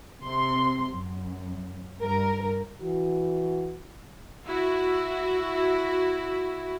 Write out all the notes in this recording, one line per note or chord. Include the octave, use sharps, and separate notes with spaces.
C3 C6
F#2
G2 A#4
E3 F#4
E4 F#4